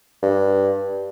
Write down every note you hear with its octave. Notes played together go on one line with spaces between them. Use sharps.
G2